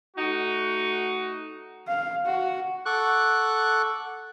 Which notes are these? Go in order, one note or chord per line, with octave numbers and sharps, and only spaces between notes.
A3 D#4 F#4
F5
F#4
A4 F#5 C#6 D6 F#6